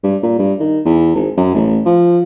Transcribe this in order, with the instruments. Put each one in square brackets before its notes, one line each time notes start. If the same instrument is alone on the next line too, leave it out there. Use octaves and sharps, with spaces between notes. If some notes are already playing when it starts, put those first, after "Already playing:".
[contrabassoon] G2
A#2
G2
D#3
E2
G#1
F#2
A1
F3